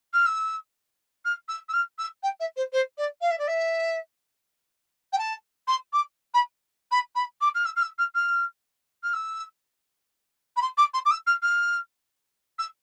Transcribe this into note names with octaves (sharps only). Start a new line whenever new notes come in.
F6
E6
F6
E6
E6
F6
E6
G5
E5
C5
C5
D5
F5
E5
D5
E5
G5
A5
C6
D6
B5
B5
B5
D6
F6
E6
F6
E6
F6
F6
F6
E6
B5
C6
D6
C6
D6
E6
F6
F6
E6